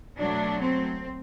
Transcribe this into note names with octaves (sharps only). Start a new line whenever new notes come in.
B2 F#3 A3 D4
C4